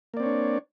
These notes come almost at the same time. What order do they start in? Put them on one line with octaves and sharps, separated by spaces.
A#3 D5 C4 C#5 D4